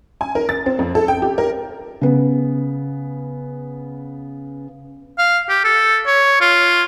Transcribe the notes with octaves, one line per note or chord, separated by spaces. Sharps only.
G#5
A#4
A6
C4
F2
A4
G5
G4
A#4
C#3 B3
F5
G4
A4
C#5
F4